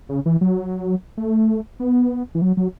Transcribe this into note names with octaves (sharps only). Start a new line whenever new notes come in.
C#3
E3
F#3
A3
B3
E3
F#3
F#3